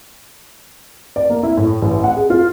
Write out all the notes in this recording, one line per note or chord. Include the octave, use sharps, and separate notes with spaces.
D5
A#3
E4
A2
A1
F#5
G#4
F4